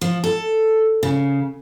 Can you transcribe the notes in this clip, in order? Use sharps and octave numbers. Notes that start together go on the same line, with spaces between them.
F3
A4
C#3